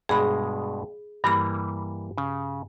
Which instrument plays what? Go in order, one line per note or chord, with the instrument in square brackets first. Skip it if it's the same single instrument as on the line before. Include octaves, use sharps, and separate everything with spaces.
[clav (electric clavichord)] G2 B2 G#3 [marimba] G#4 B5
[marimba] G2 B5 [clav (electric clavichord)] E3 G3 A#3
[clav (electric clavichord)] C#3